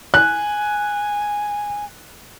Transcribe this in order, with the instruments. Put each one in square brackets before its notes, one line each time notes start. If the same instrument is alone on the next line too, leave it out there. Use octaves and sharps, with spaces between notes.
[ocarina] G#5 [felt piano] F#6